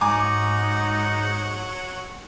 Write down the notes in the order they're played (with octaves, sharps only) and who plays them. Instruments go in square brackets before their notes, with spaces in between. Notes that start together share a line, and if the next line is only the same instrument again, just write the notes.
[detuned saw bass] G#2 [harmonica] F#3 F#5 C#6 [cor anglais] D#4 [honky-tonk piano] G#5 A#5 D6